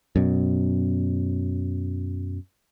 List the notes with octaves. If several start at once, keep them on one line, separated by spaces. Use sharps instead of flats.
F#2 B2